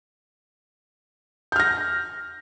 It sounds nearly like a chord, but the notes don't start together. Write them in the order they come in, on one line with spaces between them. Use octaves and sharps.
G6 F6 A#6